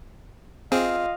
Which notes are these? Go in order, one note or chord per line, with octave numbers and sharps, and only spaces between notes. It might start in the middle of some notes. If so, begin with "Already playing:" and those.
C4 F4 G#4 D#5 F5